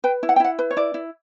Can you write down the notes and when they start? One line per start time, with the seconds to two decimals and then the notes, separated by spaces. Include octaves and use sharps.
0.04 B4 G5
0.23 E4
0.29 F#5
0.36 G5
0.40 E4 F#5
0.59 B4
0.71 C#5
0.77 E4 D5
0.94 E4